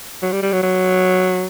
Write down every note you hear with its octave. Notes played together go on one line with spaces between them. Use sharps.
F#3
G3
G3
F#3
F#3